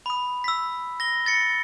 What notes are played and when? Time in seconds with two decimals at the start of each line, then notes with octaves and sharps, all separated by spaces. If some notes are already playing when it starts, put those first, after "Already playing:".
0.06 B5 D#6
0.44 E6 B6
1.00 A#6 G7
1.26 A6 A#6 C#7